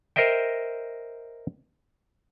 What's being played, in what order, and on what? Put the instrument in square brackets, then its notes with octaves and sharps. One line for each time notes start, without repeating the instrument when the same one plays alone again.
[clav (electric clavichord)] A#4 C5 D#5 E5 G5